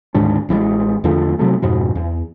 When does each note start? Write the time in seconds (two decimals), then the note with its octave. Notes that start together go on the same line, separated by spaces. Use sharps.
0.14 D2 G#2 D#3 D4
0.49 A1 E3 G3 G#3
1.04 E2 D3 F3 A3
1.39 C3 F#3 A3
1.62 F2 G#2 B2
1.95 E2